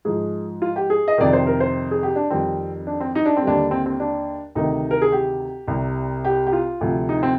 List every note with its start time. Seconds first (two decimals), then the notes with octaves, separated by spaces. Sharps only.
0.05 G#2 F3 G#4
0.62 F4
0.76 G4
0.90 G#4
1.08 D#5
1.18 F2 C3 D#3 D5
1.33 C5
1.47 A#4
1.60 C5
1.91 G#4
2.03 G4
2.16 D4
2.30 F2 D#3 G3 C4
2.87 D4
3.00 C4
3.15 D#4
3.26 D4
3.37 C4
3.42 D#2 D3 G3 D4
3.71 C4
3.86 C4
4.00 D4
4.55 D2 C3 D#3 D#4
4.91 A#4
5.02 G#4
5.12 G4
5.68 C2 C3 G3
6.25 G4
6.47 G4
6.53 F4
6.81 D2 C3 F3
7.09 D#4
7.23 C4